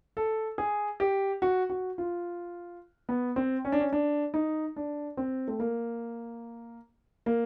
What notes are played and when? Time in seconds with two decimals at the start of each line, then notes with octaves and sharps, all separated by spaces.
0.17 A4
0.58 G#4
1.00 G4
1.42 F#4
1.70 F#4
1.98 F4
3.09 B3
3.36 C4
3.65 C#4
3.72 D4
3.80 C#4
3.92 D4
4.34 D#4
4.76 D4
5.17 C4
5.48 A3
5.60 A#3
7.26 A#3